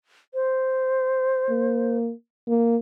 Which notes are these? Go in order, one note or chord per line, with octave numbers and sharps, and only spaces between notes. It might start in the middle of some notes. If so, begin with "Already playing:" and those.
C5
A#3
A#3